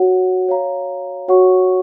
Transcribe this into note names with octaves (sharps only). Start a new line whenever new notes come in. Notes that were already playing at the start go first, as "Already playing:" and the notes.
Already playing: F#4 C#5 F#5
C#5 F5 A#5
F#4 C#5 F#5 C#6